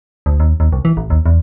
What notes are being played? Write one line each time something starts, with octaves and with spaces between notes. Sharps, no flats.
D2
D#2
D#2
C2
E3
A1
D#2
E2